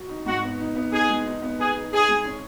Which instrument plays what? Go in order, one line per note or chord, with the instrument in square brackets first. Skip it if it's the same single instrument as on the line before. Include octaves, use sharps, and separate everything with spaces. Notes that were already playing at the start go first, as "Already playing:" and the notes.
Already playing: [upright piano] F#4
D#4
[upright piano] G#2 [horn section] F#4
[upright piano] B3
D#4
B3
[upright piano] D#4 [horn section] G#4
[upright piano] G#3
D#4
B3
[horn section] G#4 [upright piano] B4
[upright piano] D#4
[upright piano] D#4 [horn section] G#4
[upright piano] G#3
C#4